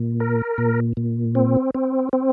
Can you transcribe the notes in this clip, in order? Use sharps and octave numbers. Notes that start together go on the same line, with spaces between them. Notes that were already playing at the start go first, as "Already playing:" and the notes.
Already playing: A#2
A#4
A#2
A#2
C4
C4
C4